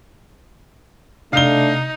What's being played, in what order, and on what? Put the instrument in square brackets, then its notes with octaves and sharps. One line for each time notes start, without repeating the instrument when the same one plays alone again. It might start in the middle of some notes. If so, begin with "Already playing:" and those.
[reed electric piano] C3 [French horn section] A3 D4 [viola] D#4 [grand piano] F5 G7